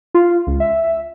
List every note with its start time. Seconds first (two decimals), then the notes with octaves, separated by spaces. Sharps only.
0.14 F4
0.47 C#2
0.60 E5